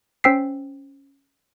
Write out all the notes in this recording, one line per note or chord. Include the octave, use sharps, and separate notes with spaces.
C#4 C5 G5 E6 B6 C7